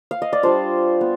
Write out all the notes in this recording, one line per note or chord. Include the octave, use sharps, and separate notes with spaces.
F5
D#5
D5
G3 D4 F4 C5
B3